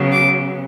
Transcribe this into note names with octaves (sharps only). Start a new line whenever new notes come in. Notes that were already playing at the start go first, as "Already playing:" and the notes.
Already playing: C#3 F#3 B3
D6